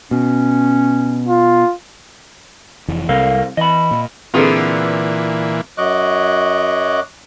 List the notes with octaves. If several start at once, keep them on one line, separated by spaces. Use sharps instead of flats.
B2 C#4
F4
F1 F2 E3
C2 C3 G3 A4 A#4 F5
E3 D#5 B5
A#2
A#2 D3 E3 B3 C4 F4 G#4 A4
F#2 F#3 D#5 C#6 D6 F#6